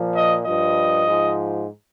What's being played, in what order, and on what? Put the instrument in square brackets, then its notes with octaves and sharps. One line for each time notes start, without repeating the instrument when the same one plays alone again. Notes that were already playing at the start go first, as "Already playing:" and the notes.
Already playing: [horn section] A#2 F3
D#5
G2 F3 D#5
G#2 F3